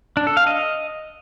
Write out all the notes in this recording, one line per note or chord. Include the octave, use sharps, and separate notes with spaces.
D4
A4
F5
D#5